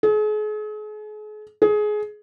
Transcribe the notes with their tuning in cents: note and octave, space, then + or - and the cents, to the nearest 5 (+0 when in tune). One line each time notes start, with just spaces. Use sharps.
G#4 +40
G#4 +20